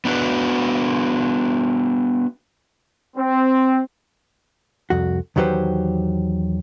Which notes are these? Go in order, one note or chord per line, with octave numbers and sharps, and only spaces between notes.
B3 D4 F#4 B4
C4
C2 F2 F#4
E2 D#3 F#3 G4 B4 C5